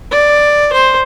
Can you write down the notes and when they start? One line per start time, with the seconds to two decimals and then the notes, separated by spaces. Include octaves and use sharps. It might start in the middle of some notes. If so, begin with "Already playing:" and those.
0.12 D5
0.73 C5